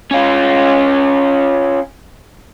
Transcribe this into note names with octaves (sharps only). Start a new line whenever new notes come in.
C#4 F4